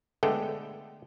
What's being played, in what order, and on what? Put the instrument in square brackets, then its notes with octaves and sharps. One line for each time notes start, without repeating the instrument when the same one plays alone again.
[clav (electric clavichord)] D3 G#3 A3 B3 A4 G5